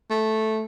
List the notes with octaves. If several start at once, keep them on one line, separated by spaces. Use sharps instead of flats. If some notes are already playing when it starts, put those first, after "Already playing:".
A3